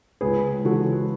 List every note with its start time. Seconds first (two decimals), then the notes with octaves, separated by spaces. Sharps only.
0.21 C#2 G#4 B4
0.65 C#3 E3 G#3 F#4 A4